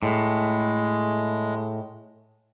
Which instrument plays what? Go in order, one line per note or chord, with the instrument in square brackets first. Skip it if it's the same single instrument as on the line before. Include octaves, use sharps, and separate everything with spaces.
[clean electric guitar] A2 [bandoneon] G#3